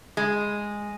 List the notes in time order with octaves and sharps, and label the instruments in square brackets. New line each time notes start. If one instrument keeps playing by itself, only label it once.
[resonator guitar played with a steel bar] G#3